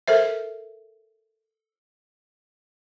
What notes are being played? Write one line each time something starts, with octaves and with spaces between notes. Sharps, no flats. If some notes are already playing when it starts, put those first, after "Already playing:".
A4 A#4 C5 E5